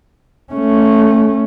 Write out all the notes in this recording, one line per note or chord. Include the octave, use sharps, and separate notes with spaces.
A3 C#4